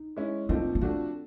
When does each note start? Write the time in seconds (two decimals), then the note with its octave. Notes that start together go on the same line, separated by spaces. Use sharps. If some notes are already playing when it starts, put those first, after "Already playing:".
Already playing: D#4
0.17 G#3 C#4 E4
0.49 A#2 F3 A3 C4 D4 D#4
0.75 B3
0.81 F3 A3 C4 D4 F#4